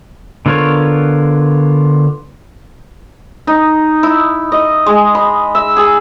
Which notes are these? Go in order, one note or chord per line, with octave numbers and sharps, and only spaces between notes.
D3 B3 F4 A#4 C#5
D#4
E4
D#5
G#3
B5
E5
G#4